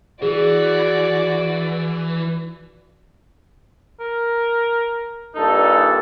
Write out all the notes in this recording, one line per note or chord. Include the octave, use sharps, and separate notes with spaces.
E3 F#4 G#4 D5
A#4
G2 A#2 D#4 A4